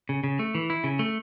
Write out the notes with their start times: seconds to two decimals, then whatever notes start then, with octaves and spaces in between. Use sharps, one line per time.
0.09 C#3
0.24 C#3
0.39 A3
0.55 E3
0.70 E4
0.84 C#3
0.99 A3